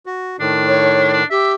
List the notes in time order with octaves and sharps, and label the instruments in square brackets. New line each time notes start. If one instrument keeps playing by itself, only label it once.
[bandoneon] F#4
[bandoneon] A2 D#3 [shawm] D4
[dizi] C#5
[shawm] D4
[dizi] G4 [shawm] E5